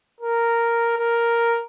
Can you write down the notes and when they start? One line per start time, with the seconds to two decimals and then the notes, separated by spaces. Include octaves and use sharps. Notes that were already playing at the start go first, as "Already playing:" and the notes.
0.21 A#4
0.97 A#4